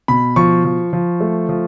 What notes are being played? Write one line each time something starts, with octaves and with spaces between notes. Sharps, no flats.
B2 B5
F3 C#6
F3
F3
A3
F3